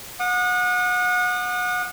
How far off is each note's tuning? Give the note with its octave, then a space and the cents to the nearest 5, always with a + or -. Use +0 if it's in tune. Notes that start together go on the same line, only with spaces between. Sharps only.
F#5 -30 D#6 -40